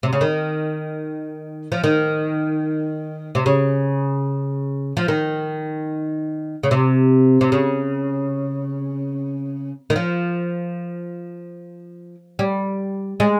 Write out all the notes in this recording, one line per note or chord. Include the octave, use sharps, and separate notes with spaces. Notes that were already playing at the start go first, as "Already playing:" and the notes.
C3
C#3
D#3
F3
D#3
C3
C#3
F3
D#3
C#3
C3
C3
C#3
D#3
F3
G3
G#3